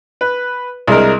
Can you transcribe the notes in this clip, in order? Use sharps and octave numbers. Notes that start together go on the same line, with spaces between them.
B4
C2 G#3 A#4